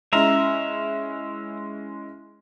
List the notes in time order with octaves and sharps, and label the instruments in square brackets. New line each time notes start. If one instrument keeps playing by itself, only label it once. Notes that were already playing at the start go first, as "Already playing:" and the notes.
[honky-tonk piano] G#3 C#4 E4 [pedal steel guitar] E5 A#5